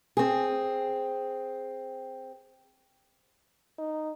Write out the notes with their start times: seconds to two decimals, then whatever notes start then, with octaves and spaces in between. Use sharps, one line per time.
0.17 C4 G#4
3.78 D#4